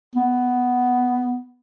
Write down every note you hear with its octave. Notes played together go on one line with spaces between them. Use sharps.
B3